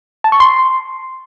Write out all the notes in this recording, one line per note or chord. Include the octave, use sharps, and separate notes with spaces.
A5
C#6
C6